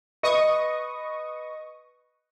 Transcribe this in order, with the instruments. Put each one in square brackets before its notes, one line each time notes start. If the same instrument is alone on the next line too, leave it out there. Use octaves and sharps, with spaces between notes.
[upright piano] B4 D#5 [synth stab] C#6 D#6